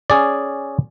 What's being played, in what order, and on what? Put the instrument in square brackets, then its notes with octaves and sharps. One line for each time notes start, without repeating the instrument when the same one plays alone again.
[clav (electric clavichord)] C#4 G#4 D5